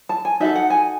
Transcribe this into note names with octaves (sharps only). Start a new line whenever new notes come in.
A5
G#5
D#4 F#4 A4 E5
F#5
G#5